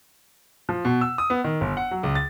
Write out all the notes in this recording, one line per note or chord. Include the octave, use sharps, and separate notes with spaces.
F3
B2
E6
D#6
B3
D#3
G1
F#5
F#3
C#2
A6